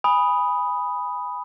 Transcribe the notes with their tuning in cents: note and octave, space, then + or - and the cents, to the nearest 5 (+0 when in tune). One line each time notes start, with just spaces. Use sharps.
G#5 -15 B5 +0 D#6 +0